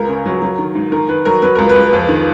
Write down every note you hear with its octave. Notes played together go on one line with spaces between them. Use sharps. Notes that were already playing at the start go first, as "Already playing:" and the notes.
Already playing: C#2 A#4
C#3
F#3
F#3
D#3
G#2
D#3 A#4
D#3 B4
F#3 A#4
F#3 B4
C#2 A#4
B4
C#2
F2
D#3